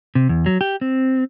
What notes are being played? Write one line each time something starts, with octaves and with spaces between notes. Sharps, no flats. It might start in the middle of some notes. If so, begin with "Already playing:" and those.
C3
E2
F#3
G4
C4